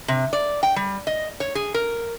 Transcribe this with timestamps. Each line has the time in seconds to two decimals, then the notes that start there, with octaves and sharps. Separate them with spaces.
0.08 C3
0.33 D5
0.63 G5
0.76 G3
1.07 D#5
1.40 C#5
1.55 G#4
1.74 A#4